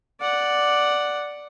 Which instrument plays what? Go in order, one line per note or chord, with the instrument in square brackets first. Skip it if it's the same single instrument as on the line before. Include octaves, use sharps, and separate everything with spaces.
[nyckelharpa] D5 F#5